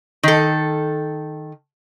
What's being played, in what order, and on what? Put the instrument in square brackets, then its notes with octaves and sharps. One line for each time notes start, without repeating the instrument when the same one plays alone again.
[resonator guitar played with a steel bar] D#3 A4